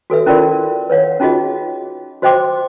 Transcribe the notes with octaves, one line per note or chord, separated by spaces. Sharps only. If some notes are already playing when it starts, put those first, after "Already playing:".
F#4 A4 B4 E5
C#4 E4 F4 A#4 D5 C6
B4 C#5 F5 F#5
C#4 D#4 F4 F#4 G#4 D#5
F#4 C5 D#5 G5 C6 D6